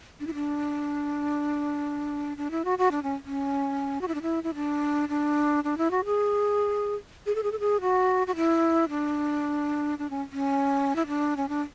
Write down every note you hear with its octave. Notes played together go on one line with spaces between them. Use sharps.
D4
E4
D4
D4
E4
F#4
F#4
D4
C#4
C#4
F#4
E4
D4
E4
E4
D4
D4
D4
E4
F#4
G#4
G#4
A4
G#4
A4
G#4
F#4
F#4
E4
D4
D4
C#4
C#4
E4
D4
C#4
D4